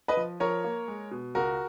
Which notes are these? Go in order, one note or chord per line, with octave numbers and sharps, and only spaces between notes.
B4 D#5
F3
F3 A#4 C#5
A#3
G#3
B2
C#2 F#4 A#4